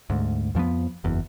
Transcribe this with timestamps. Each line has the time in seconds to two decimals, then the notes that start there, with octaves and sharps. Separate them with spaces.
0.10 D2 G#2
0.55 F2 F3 A#3 B3
1.04 F#1 E2